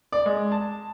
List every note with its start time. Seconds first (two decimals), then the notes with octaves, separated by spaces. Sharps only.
0.12 D5
0.26 G#3
0.52 A5